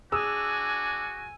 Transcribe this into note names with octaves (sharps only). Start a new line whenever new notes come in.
D4 F#4 G#4 G#5 D#6 E6